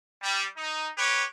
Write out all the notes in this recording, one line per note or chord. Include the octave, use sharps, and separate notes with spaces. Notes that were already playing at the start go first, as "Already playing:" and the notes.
G3
D#4
G4 B4 C#5